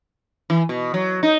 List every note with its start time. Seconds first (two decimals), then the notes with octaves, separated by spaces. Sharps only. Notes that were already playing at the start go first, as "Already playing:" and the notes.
0.50 E3
0.69 B2
0.94 F#3
1.23 D#4